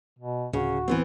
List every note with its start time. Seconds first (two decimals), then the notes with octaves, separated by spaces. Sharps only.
0.19 B2
0.53 D1 C#3 F#4
0.88 E3 B3 C4